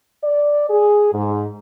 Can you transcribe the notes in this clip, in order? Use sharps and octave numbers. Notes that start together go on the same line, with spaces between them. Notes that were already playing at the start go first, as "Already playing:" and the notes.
D5
G#4
G#2